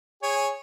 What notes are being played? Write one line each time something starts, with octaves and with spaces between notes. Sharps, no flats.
G#4 C#5